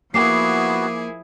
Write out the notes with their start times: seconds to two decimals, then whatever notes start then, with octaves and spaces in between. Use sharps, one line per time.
0.14 F3 A#3 B3 E4 F#4 G#4 D6 C7